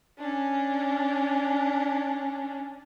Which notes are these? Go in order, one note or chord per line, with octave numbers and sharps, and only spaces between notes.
C#4 D4